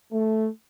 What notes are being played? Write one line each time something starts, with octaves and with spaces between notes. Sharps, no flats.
A3